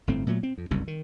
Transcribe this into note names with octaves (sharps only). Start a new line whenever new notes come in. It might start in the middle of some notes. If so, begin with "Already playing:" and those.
G1 A2 A3 C4
A#2 F#3 A3
C4
F2
F#1 C2 G2
D#3